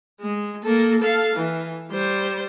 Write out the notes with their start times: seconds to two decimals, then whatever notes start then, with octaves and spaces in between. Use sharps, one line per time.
0.20 G#3
0.63 A#3 A4
1.00 A4 F5
1.36 E3
1.91 G3 C5